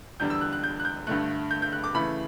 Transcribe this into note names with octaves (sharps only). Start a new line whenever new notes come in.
E2 D3 G3 D4 G6
E6
F#6
F#6
G6
F#6
G6
G2 D3 A3 F#6
G6
G6
F#6
D6
C#3 E3 A3 B5